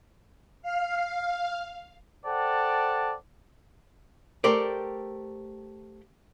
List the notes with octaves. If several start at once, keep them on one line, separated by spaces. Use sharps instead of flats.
F5
A4 C5 D5 F#5 G5 A5
A3 G4 A4 A#4 C5 D5